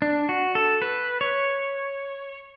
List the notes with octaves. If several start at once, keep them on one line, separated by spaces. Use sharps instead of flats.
D4
F#4
A4
B4
C#5